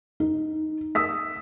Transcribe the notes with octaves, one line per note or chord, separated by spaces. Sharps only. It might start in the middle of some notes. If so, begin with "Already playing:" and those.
D#4
D#6 E6 B6